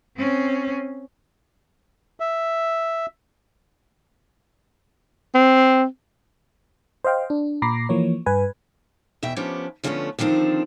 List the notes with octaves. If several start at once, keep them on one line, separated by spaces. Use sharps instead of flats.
C4 C#4
E5
C4
C5 D#5 F5 G5
D4
A#2 A#5 B5 D6 A#6 C7
E3 F3 A#3 C#5
G2 B4 G#5
E2 B2 E5 G5
F3 B3 C#4 D4 G4
D3 F3 G3 A3 B3 C#4
D3 D#3 F3 C4 D4